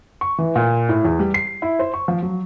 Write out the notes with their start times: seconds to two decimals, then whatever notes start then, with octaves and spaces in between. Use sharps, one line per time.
0.21 C#6
0.38 E3
0.56 A#2
0.89 A2
1.05 E2
1.19 G3
1.34 C7
1.62 E4
1.79 C5
1.94 C#6
2.08 F3
2.22 F#3